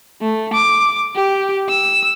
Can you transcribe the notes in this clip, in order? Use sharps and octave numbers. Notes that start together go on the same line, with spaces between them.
A3
D6
G4
E6